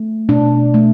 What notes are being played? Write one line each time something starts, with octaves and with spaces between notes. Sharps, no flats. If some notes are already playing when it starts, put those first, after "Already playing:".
Already playing: A3
B2 D4
A3